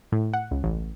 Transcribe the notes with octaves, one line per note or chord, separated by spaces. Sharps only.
A2
F#5
C#2
A1